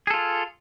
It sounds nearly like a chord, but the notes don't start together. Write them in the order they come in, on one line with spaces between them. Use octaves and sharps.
G#4 A4 F4